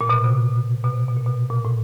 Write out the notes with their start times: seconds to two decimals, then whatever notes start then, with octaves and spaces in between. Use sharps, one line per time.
0.01 A#2
0.09 B2
0.24 C3
0.84 B2
0.94 C3
1.08 B2
1.17 A#2
1.26 B2
1.50 A#2
1.65 A2